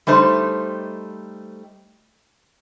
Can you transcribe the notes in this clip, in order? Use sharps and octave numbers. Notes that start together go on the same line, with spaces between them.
G3 A3 D#4 C5